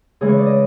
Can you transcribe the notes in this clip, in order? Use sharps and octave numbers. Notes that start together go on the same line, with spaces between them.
C#3 E3 G#3 G#4
C#5
D5
D#5